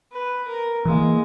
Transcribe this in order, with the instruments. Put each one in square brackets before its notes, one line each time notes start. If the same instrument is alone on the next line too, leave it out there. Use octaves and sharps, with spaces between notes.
[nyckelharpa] B4
A#4
[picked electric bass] E3 A#3 [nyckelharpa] G#3